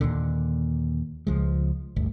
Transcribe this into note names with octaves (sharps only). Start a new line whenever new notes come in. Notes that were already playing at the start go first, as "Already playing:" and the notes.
D#2 A#2 D3
C#2 F3 G#3
G1 D2